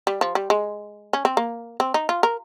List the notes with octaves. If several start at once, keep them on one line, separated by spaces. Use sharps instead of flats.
G3
F3
G3
G#3
C#4
C4
A#3
C4
D#4
F4
A#4